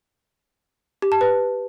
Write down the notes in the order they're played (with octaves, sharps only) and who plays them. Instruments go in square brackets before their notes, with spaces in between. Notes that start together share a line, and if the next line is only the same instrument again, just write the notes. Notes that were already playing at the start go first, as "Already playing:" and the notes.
[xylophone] G4
A5
B4